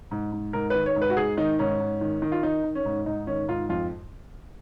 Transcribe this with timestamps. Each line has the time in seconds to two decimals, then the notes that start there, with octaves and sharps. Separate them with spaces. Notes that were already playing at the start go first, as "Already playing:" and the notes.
0.11 G#2
0.32 G#2
0.53 G#2 A#4
0.70 D#3 B4
0.86 C#5
0.96 G#2
1.02 B4
1.10 F#4
1.17 G#2 G#4
1.37 D#3 D#4
1.59 G#2 C#4
1.80 G#2
2.01 D#3
2.22 D#3
2.32 F4
2.43 D#3 D#4
2.64 D#3
2.75 C#4
2.86 G#2
3.06 G#2 D#4
3.27 D#3 C#4
3.48 G#2 F4
3.69 F2 F4